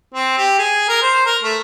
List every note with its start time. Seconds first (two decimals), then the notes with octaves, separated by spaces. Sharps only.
0.14 C4
0.38 G4
0.59 G#4
0.89 A#4
1.02 C5
1.26 A#4
1.43 A3